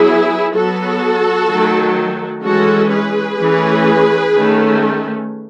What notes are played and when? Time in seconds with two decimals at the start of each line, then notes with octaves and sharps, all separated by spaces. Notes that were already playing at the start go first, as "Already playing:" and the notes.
Already playing: F#3 B3 E4 G#4
0.55 F#3 B3 F#4 A4
1.50 D#3 F#3 A3
2.44 E3 G#3 C#4 F#4 A4
2.91 G#4 B4
3.39 E3 A3 C#4
4.34 D#3 A3 C#4